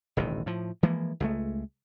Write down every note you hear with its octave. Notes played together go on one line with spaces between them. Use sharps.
D#1 A1 C3 D#3
A2 F3
E3 F3 G#3 A#3
C#2 G#3 A3